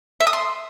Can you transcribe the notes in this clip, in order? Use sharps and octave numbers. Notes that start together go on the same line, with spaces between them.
E5
D#6
C6